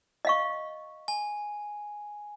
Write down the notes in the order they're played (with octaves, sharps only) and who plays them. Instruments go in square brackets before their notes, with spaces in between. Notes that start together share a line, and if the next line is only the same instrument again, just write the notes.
[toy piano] D#5 F5 C#6
[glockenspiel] G#5